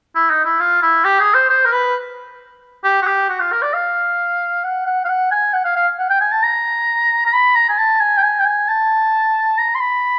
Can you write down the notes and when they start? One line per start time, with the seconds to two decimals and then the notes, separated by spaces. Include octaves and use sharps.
0.15 E4
0.30 D#4
0.45 E4
0.60 F4
0.82 E4
1.05 G4
1.20 G#4
1.34 C5
1.50 C5
1.65 A#4
1.72 B4
2.84 G4
3.02 F#4
3.07 G4
3.29 F#4
3.40 F4
3.52 A#4
3.62 D5
3.74 F5
4.64 F#5
4.86 F#5
5.05 F5
5.09 F#5
5.31 G#5
5.54 F#5
5.65 F5
5.76 F5
5.99 F#5
6.10 G5
6.21 G#5
6.32 A5
6.43 A#5
7.26 A#5
7.33 B5
7.56 A#5
7.69 G#5
7.78 A5
8.00 G#5
8.18 G5
8.23 G#5
8.40 G5
8.46 G#5
8.68 A5
9.58 A#5
9.75 C6
9.80 B5